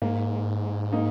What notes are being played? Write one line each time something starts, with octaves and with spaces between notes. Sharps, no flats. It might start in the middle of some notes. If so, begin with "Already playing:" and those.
G#2 A#3
A#3 D#4